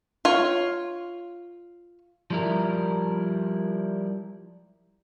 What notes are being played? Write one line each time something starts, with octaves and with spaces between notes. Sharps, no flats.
F4 C#5
F3 G3 E4 A#4